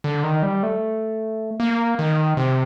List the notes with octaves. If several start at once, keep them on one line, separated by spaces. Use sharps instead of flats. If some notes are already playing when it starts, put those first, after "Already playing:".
D3
D#3
G3
A3
A#3
D#3
C3